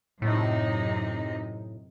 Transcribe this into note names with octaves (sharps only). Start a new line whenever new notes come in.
F#2 A2 C3 D#4